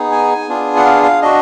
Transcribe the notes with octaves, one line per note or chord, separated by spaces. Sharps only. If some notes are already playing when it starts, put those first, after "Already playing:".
Already playing: B3 D#4 G#4
G#5
B3 D4 F4 G#4
F#5
F5
F5
D4 F#4 D#5